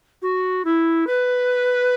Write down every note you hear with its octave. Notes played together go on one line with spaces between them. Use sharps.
F#4
E4
B4